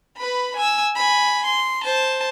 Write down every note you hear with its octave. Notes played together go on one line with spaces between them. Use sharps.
B4 B5
G#5 E6
G#5 B5
C6
C5 A5